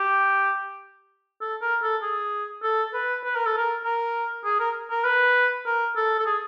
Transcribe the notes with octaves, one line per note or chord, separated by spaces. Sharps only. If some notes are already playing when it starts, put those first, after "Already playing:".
Already playing: G4
A4
A#4
A4
G#4
A4
B4
B4
A#4
A4
A#4
A#4
G#4
A#4
A#4
B4
A#4
A4
A4
G#4